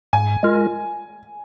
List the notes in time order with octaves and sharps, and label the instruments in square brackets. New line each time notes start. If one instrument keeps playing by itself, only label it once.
[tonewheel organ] G#2 [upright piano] G#5
[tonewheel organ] G#3 F4 A#4